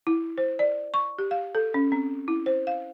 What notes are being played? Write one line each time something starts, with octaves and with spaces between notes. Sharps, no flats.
E4
C5
D5
C#6
G4
F5
A4
C#4
C4
E4
C5
F5